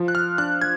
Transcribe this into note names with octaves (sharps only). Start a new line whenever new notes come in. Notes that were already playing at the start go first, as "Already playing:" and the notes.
Already playing: F3
F#6
F6
D4 F#6
G#6